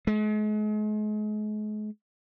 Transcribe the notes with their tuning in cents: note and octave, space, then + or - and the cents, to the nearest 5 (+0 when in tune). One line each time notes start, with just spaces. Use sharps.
G#3 +40